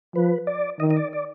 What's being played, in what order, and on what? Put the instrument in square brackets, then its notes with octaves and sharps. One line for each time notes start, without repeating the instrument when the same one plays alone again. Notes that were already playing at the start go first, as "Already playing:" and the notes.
[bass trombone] F3 [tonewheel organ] B4
[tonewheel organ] D5
[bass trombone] D#3 [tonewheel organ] D#5
[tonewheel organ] D#5
D5
D5